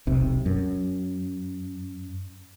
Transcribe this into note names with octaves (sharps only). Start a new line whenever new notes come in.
E1 B1 C3
F#2